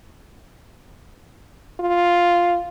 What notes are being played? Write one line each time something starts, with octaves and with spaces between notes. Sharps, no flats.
F4